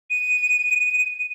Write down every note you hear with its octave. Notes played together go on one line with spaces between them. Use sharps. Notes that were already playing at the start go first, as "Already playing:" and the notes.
D#7